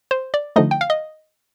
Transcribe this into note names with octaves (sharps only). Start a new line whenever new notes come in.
C5
D5
D3 F3 A3 D#4 D#5
G5
F5
D#5